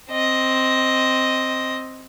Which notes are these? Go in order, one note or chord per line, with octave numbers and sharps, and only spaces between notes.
C4 D#5